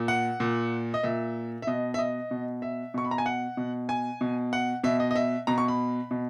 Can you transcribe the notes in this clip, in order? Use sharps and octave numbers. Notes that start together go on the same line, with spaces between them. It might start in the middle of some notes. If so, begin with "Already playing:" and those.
Already playing: A#2
F#5
A#2
D#5
A#2 E5
E5
B2 D#5
E5
D#5
B2
E5
B2 C#6
B5
A#5
G#5
F#5
B2
G#5
B2
F#5
B2 E5
D#5
D#5
E5
B2 A#5
C#6
B5
B2